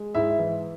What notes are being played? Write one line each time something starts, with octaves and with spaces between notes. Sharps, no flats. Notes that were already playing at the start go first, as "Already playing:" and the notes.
Already playing: G#3
G#2 E4 E5
E3